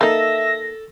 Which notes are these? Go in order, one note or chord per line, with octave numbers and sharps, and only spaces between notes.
A#3 D#4 A4 E5 A#6